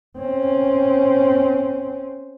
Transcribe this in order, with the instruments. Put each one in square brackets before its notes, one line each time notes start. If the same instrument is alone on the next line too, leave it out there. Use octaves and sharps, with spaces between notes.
[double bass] C4 C#4